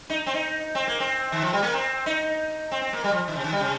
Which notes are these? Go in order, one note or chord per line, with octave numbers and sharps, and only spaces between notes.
D#4
C4
D#4
C4
A#3
C4
D#3
F3
G3
A#3
C4
D#4
C4
C4
A#3
G3
F3
D#3
C3
D#3
G3
C3